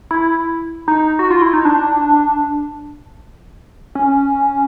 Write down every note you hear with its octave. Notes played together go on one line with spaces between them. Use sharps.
E4
D#4
F#4
F4
E4
D#4
D4
C#4